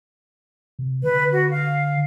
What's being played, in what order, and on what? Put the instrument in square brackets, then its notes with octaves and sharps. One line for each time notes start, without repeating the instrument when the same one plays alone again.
[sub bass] C3
[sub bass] D3 [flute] B4
[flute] F#4
F5